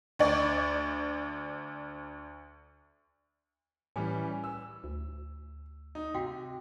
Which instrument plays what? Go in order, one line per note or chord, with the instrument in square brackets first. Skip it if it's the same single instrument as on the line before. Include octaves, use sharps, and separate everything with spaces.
[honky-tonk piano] D2 D5
[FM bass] A2 [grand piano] E3 G3 C#4 [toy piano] G#5
[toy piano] A#4 [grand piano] E6
[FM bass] D2
[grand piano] D#4
[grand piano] C3 [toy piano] F#4 F5 G5